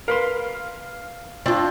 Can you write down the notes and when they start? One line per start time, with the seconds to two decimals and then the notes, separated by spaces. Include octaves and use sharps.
0.08 A#4 B4 F5 C6
1.46 C4 D4 F4 C#6